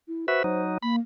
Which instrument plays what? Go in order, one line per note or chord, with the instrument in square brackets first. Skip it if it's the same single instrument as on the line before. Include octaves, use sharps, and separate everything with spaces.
[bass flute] E4
[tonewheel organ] F#4 B4 E5 [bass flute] C5
[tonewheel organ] F#3 D#4
[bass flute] A#3 [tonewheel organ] B5